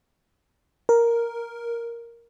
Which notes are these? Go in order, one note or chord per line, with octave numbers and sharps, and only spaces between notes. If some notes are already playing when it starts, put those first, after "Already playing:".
A#4